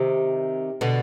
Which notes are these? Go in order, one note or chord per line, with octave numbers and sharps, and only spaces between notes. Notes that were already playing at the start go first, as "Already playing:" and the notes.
Already playing: C3 D#3
B2 D3